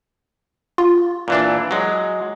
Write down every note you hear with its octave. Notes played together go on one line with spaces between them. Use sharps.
F4
A#2 E3 D4
F#3 G#3